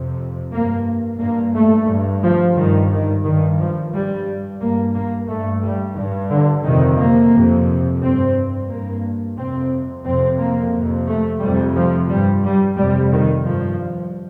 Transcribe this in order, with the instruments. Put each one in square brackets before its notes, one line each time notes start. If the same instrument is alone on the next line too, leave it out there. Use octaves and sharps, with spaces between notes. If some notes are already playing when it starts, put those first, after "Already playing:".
Already playing: [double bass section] F2 C3
G2 A#3
G2 A#3
A3
G2
F3
G2 D#3
D#3
G2 D#3
F3
G2 G3
G2 A#3
A#3
G2 A3
G3
G2
D3
F2 C3 D#3
A#3
F2 C3
G2 C4
G2 A#3
F2 C3 C4
F2 C3 C4
A#3
F2 C3
A3
F2 C3 G3
F3
G2 G3
G3
F2 C3 G3
D#3
G2 F3